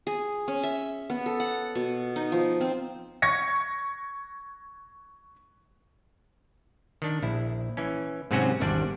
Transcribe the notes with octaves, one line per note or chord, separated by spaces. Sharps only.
G#4
C#4
E5
B3
A4
F#5
B2
D#4
F3
C4
C#6 G#6 A#6 C#7
D#3 D4
A#1 E4
E3 C#4
G#2 C3 F#3 C4 C#4 F#4
G#1 E2 G3 D4 D5